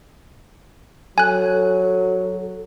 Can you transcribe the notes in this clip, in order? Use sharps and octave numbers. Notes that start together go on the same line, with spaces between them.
F#3 A4 G#5 F#6